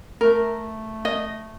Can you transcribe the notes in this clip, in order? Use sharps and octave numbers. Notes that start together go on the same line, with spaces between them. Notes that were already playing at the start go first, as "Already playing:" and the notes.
A3 A#4
D#5